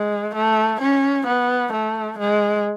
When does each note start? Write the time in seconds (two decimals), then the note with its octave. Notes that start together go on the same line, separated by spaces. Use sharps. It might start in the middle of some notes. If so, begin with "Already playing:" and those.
Already playing: G#3
0.35 A3
0.81 C#4
1.27 B3
1.73 A3
2.19 G#3